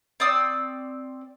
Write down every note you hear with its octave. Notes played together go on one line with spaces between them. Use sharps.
C4 D5 D#6 E6